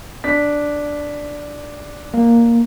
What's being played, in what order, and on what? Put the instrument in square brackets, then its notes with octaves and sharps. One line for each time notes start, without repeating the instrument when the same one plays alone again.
[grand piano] D4 B6
[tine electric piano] A#3